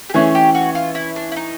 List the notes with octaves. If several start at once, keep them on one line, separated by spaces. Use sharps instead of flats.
G4
E3 A3 C#4 G#4
G4
F#4
F4
E4
D4
E4
D#4